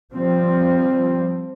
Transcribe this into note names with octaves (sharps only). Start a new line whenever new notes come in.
F3 G3 C4